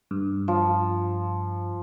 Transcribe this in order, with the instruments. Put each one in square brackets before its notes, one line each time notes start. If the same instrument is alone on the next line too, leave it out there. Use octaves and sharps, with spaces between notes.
[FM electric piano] G2
[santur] F3